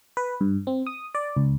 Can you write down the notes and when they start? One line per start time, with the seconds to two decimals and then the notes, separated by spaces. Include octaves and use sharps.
0.17 B4
0.41 G2
0.67 C4
0.87 D#6
1.15 D5
1.37 C#2